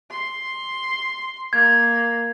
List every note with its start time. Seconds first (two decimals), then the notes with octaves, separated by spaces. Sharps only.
0.11 C6
1.53 A#3 G#6